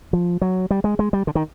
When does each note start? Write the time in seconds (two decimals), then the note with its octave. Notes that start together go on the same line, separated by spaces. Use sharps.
0.13 F3
0.42 F#3
0.71 G3
0.84 G#3
0.99 G#3
1.13 G3
1.27 D3
1.35 D#3